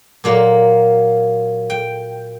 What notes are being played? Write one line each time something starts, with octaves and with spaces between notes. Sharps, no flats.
A#2 F#3 A#3
G5